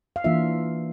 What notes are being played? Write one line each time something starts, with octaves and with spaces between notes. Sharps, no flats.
F5
E3 A#3 D4 F4 E5